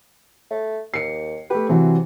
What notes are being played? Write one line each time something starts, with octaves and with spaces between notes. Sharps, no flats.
A3
D#2 C7 C#7
A3 G4 B4
C3 E3 F#3 C4